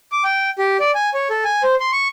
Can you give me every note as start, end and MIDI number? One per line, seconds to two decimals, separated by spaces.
0.12 0.24 86
0.24 0.50 79
0.59 0.77 67
0.80 0.91 74
0.95 1.10 80
1.14 1.28 73
1.30 1.44 69
1.45 1.62 80
1.63 1.75 72
1.80 1.91 84
1.92 2.08 85